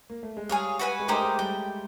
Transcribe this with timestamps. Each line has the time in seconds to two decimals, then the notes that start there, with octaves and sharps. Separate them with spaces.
0.10 A#3
0.23 A3
0.37 G#3
0.49 G3 G#4 C#5 F5
0.79 F#4 B4 E5 G#5
0.99 G#3
1.08 A3 A#3 D#4 G4 C5
1.23 G#3
1.38 G3 G5